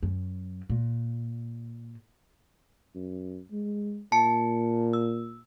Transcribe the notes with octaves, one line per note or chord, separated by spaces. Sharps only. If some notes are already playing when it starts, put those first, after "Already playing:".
F#2
A#2
F#2
G#3
A#2 A5 C#7
E6